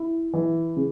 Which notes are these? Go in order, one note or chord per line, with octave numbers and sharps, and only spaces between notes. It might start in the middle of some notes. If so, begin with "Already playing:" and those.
Already playing: E4
E3
C#3